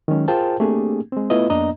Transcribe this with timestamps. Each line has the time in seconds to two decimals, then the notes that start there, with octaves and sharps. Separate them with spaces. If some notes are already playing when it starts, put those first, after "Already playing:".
0.08 D#3 F#3 G#3 C#4
0.28 F4 G#4 A#4 C5 G5 A5
0.60 A3 A#3 C4 D4 G4 G#4
1.12 G#3 C4
1.30 A3 B3 E4 F4 B4 D#5
1.50 F2 A#3 B3 D4 D#5 A#5